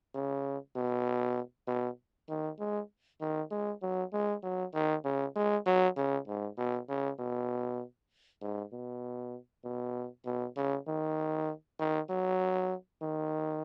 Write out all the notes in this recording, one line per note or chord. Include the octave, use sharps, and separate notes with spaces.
C#3
B2
B2
D#3
G#3
D#3
G#3
F#3
G#3
F#3
D#3
C#3
G#3
F#3
C#3
G#2
B2
C#3
B2
G#2
B2
B2
B2
C#3
D#3
D#3
F#3
D#3